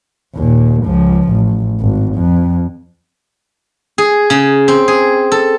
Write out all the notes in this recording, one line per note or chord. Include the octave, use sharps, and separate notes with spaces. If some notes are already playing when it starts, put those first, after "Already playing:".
D#2 A#2
C#2 F3
A1
G#1
F2
G#4
C#3
C4
G#4
A4